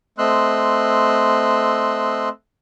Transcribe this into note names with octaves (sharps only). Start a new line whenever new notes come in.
A3 C4 D#5 C6 E6 F#6